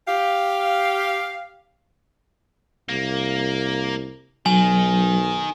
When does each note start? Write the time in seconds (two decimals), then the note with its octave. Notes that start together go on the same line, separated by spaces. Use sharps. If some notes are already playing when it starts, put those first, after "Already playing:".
0.08 G4 F5
2.89 C2 A#3
4.46 B1 D#3 F#3 G#5